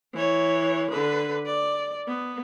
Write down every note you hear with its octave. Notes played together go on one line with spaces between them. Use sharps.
E3 C#5
D3 B4
D5
B3